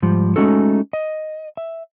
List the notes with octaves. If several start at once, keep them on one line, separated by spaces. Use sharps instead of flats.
G#2 F3 G3
G#3 A3 C#4 D#4 F#4 A4
D#5
E5